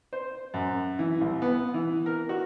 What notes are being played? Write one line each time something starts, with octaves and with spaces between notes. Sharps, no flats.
C5
F#2
E3
C2
B3
E3
A#4
F#4